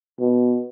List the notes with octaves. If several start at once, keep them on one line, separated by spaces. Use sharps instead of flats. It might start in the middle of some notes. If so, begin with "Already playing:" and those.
B2